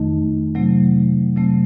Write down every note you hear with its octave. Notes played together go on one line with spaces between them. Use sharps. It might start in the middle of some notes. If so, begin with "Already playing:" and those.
Already playing: F2 D#3 A3 D#4
C3 F#3 A3 C4
C3 F#3 A3 C4